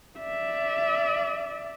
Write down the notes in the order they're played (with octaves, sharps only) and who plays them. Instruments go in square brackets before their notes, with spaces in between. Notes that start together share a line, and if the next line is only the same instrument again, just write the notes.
[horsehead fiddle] D5 E5